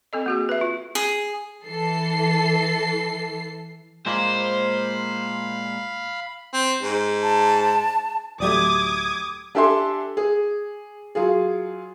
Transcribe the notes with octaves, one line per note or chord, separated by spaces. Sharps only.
C4 A4 D#5
A#3 F#4 G#4
B4 E5
F4
G#4
E3 A4 C7
A#2 G#3 A#3 C5 F5 B5
C4
G#2
A5
D1 F#3 A3 G4 D5 D6 D#6 G#6
D4 G4 A4 E5 G#5 C6
G#4
F#3 F4 G#4